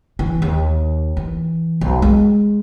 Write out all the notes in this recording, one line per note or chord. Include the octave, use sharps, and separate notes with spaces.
E3
D#2
E3
B1
G#3